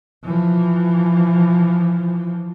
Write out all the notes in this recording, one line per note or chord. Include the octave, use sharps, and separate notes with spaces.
E3 F3